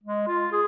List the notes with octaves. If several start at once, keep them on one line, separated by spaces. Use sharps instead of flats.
G#3
F4
G#4